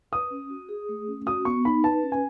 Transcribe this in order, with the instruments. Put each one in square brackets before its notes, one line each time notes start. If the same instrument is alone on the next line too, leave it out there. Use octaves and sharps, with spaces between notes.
[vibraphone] B4 [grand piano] D#6
[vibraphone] C#4
F#4
G#4
A3
C#4
[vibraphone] F#4 [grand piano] D#6
[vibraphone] B3 [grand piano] C#6
[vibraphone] D#4 [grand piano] B5
[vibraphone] B4 [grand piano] A5
[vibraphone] C#4
[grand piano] G#5